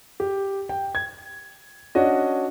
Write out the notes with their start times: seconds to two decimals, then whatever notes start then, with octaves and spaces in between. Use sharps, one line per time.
0.20 G4
0.69 G5
0.95 G#6
1.95 C#4 D4 F#4 D#5